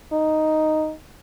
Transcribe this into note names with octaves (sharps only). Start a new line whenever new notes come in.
D#4